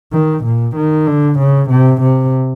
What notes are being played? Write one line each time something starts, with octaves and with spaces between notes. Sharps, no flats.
D#3
A#2
D#3
D3
C#3
C3
C3